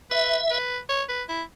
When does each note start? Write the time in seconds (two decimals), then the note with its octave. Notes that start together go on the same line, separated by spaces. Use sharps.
0.11 B4 E5
0.50 B4
0.89 C#5
1.09 B4
1.29 E4